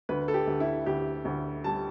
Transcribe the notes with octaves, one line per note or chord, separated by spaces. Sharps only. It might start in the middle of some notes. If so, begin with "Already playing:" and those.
D2 B4
A4
G4
D2
E4
D2 G4
D2
G3 A5